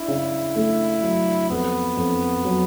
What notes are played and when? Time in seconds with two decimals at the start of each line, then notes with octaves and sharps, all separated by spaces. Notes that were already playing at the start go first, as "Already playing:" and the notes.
Already playing: D4 E4
0.08 C#3
0.56 A3
1.03 F#3
1.50 F2 B3
1.97 F2
2.45 F#3